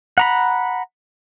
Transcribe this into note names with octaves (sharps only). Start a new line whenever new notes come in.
F#5 A#5 B5